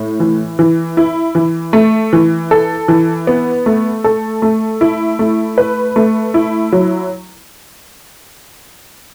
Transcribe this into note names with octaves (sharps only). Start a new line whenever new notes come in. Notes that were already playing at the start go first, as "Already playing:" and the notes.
Already playing: A2
E3
E3
E4
E3
A3
E3
A4
E3
B3
A3
A4
A3
E4
A3
B4
A3
E4
F#3